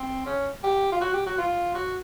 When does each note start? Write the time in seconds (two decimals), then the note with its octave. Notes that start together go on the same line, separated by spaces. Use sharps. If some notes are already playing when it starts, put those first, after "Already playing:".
Already playing: C4
0.26 C#4
0.64 G4
0.92 F4
1.01 F#4
1.14 G4
1.26 F#4
1.38 F4
1.75 F#4